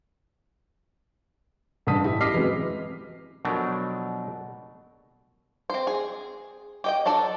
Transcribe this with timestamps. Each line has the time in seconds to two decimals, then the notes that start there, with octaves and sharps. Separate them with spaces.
1.87 A1 G2 D3 A5 D#6 B6
2.04 E4 G4
2.21 D#5 D6 F6 B6 C7
2.34 E3 F#3 G#3 C4
3.45 B2 F3 F#3 A3 D4 A#4
5.70 C4 C5
5.87 G#4
6.84 G4 D#5 G5
7.06 F#3 D4 A4 D5